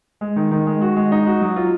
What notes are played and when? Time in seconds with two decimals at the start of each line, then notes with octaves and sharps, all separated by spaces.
0.21 G#3
0.36 D#3
0.51 D#3
0.66 G#3
0.82 F#4
0.96 G#3
1.12 D#4
1.27 F#4
1.41 F#3
1.56 F4